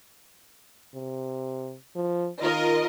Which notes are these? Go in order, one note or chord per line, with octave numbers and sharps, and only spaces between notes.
C3
F3
D#3 F4 A#4 D#5